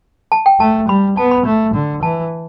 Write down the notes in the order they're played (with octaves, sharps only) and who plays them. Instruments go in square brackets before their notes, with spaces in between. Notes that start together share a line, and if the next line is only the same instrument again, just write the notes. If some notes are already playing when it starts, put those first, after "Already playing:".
[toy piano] A5
G5
[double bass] A3 [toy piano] A5
[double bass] G3 [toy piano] B5
[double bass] B3 [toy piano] A5
[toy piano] B5
[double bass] A3
D3
[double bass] E3 [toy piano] A5